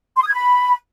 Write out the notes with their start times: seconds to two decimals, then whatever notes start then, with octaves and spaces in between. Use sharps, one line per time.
0.16 C6
0.22 D#6
0.27 G#6
0.33 B5